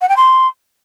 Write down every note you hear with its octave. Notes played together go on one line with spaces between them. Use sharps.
F#5
G5
C6